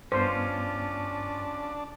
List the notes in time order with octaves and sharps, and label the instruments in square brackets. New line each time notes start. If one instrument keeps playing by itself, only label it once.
[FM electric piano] G2 B3 [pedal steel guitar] C#4 F4 [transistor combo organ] D4 [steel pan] C5